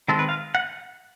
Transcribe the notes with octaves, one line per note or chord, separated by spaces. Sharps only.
D#3 G#3 C4 A4
B4
F5
F#5